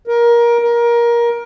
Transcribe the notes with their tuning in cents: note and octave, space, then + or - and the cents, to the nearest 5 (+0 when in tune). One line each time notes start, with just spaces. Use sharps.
A#4 +20
A#4 +20